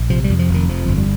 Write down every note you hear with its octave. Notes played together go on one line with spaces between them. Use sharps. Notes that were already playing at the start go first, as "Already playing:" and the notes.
Already playing: A#1
C3 F3
G3
F2
F3
F1
D#3
F2 F3
G1
G3